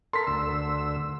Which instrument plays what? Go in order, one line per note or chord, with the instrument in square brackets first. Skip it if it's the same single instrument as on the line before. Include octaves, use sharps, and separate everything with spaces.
[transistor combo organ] A4 A#4 [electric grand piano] C6 B6
[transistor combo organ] D2 E6